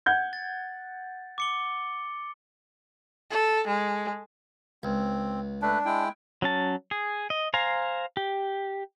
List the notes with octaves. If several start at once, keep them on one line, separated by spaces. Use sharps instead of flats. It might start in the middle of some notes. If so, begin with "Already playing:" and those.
F#5 G6 G#6
A6
D6 C#7 G7
A4
G#3
C#2 C4
A3 D4 B4
G#3 E4 G5
F#3 C#4 A5
G#4
D#5
C5 F5 G#5 A#5
G4